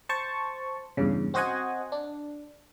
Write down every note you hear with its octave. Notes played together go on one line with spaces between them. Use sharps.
C5 A5 C#6
E2 G2 C#3
C4 F#4 C5 D#5 F#5 G#5
D4